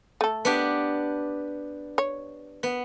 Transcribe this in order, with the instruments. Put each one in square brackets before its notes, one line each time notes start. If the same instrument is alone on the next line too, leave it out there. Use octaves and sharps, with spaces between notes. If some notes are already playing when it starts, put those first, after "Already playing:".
[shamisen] A3 A4
[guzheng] B3 D4 G4
[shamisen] C#5
[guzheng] B3